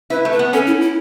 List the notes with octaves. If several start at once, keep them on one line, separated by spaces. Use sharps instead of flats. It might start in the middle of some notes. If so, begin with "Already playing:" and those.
E4 B4
A3
B4
B3
C#4 A4
E4
E4